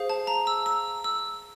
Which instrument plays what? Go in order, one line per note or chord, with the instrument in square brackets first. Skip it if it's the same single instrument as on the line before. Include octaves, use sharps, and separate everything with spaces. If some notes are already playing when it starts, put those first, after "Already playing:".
Already playing: [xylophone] G#4 C5 F5
A5
A#5
E6
E6
E6